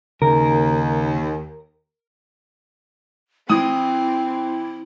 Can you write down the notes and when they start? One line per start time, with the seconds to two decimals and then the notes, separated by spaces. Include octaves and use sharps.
0.22 D#2 C#3 A#4
3.50 E3 C4 E4 D#6